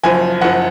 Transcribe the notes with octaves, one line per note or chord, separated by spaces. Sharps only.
F#1 F#2 F3 G#5
F#1 F#2 F3 F#5